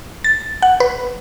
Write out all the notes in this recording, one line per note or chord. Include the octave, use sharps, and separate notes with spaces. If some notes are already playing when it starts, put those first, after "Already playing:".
A6
F#5
B4